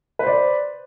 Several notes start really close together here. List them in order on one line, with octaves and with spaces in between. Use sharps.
B4 C5 D5